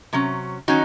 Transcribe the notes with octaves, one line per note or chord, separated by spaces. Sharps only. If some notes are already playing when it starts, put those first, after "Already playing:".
C3 F#3 C#4
D#3 F#3 C#4 D#4 F#4